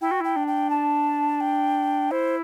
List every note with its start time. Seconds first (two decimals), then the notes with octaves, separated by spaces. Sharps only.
0.01 E4 G5
0.11 F#4
0.20 E4 G5
0.36 D4
0.47 G5
0.70 A5
1.41 G5
2.11 E4 C5